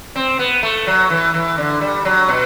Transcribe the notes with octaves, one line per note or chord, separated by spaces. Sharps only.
C4
B3
A3
F#3
E3
E3
D3
G3
F#3
B2